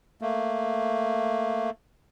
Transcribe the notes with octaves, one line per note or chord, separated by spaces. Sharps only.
A3 A#3